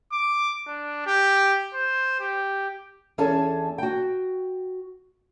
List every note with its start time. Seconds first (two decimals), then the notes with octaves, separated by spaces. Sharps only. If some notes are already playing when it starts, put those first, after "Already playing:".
0.12 D6
0.67 D4
1.06 G4
1.74 C5
2.20 G4
3.18 E2 C#4 G#4 A4 G#5 A5
3.78 F#4 G5